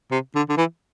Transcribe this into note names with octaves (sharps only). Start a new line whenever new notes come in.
C3
D3
D3
E3